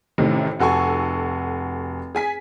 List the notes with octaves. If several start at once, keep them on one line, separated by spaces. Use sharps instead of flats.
A1 A2 C3 D#3
F1 F#4 A4 G#5 C#6
G#4 G#5 B6